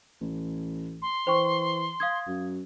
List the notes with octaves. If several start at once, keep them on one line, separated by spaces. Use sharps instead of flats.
A1
C6
E3 C5 G5 C#6
F5 D#6 G#6
F#2